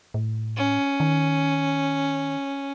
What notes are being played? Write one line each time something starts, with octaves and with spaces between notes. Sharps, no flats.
A2
C#4
D#3